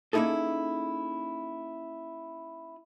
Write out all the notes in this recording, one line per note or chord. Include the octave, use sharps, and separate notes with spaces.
A#3 C#4 D#4 E4 G#4 A4